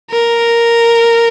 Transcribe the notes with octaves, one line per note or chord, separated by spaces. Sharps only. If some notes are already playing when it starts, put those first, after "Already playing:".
A#4